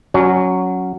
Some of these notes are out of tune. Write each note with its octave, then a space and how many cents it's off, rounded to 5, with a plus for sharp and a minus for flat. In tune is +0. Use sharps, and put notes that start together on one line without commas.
F#3 +0 C#4 +0